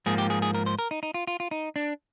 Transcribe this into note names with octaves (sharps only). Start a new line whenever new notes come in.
G#2 F3 A#3 G#4
G4
G#4
G#4
A#4
C5
A#4
D#4
D#4
F4
F4
F4
D#4
D4